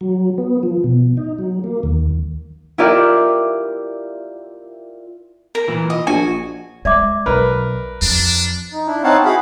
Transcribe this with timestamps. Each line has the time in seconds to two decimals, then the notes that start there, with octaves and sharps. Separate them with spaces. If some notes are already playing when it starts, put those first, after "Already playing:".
0.01 F#3
0.38 B3
0.63 F3
0.84 B2
1.17 D#4
1.39 F#3
1.64 A#3
1.83 D#2
2.78 E4 F4 G4 A#4 D5 E5
5.55 A#4
5.68 A#2 E3
5.90 D#5
6.07 A#1 F#4 G#5
6.85 G#3 C#4 D5 E5 D6
7.26 B1 A#4 B4
8.02 F2 F3 D4
8.72 D#4
8.87 D4 E4
9.04 C4 D#4 C#5 F5 F#5 A5
9.25 E4 F#4 G#4 F5 F#5 B5